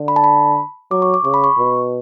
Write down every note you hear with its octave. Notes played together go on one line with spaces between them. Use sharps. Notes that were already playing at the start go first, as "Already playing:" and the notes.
Already playing: D3
B5
A5
B5
F#3 D6
C#6
D6
C#3 C#6
B5
C#6
B2